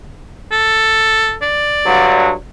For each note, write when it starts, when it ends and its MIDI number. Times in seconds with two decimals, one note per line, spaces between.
0.52 1.36 69
1.42 2.17 74
1.85 2.32 43
1.85 2.32 50
1.85 2.32 54